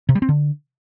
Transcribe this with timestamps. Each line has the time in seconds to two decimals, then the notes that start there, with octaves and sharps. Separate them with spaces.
0.09 C3
0.15 G3
0.22 C4
0.29 D3